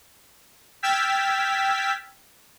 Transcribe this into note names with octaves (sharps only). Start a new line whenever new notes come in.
G5 E6 F6 G#6 A6 B6